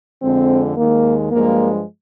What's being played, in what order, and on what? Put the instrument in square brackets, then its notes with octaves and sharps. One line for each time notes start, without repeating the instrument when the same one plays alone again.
[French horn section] F2 D3 G#3 C4
D#2 D#3 G#3 A#3
G2 F3 G#3 A#3